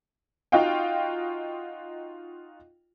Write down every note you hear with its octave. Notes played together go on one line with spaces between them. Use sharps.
D#4 F4 F#4 D#5 F5 G5